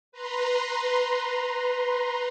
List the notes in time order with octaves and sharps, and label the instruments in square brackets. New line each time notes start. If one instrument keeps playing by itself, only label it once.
[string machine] B4 A#5 C6